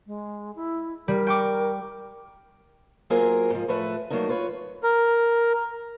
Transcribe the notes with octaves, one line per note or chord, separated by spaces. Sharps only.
G#3
E4
G3 A#4
G5 C#6 D6
F#3 A#3 F4 G#4 A#4 C5
G#2 F3
A2 F3 A3 B4 E5
F#3 A3 A#3 D4 D#4
F4 B4 C#5
A#4